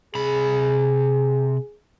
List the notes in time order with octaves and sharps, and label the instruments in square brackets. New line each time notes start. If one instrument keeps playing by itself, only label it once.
[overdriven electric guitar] C3 B5 [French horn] G#4